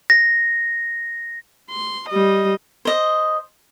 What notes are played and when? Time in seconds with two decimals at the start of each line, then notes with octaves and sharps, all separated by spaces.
0.10 A#6
1.71 C6
2.10 G3 D#5
2.85 C5 D#5